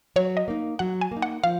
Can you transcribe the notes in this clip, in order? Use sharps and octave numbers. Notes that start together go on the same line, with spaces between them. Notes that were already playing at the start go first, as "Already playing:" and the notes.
F#3 C#5
D#5
A#3 D#4
F#3 F#5
G#5
A#3 D#4
F#5
F3 F5